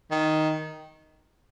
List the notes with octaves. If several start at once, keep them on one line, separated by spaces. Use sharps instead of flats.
D#3